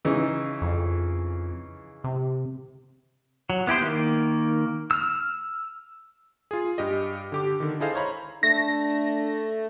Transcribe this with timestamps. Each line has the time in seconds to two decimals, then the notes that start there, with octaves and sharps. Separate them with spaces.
0.05 C#3 E3 D#4
0.61 F2
2.04 C3
3.50 F#3
3.67 B3 E4 G4 C5
3.81 D#3 A#3
4.91 E6 F6
6.51 F4 G#4
6.78 G2 G4 D#5
7.32 D3 G4 D6
7.60 D3 D#3
7.80 E4 G#4 A4 C5 D#5 F5
7.94 C5 C#5 A#5 B5
8.43 A3 D4 A#6